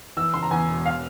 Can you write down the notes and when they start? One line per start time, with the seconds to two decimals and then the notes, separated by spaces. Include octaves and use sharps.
0.17 E3 E6
0.34 C#3 C6
0.43 A#5
0.51 E2 G#5
0.68 E1
0.85 F5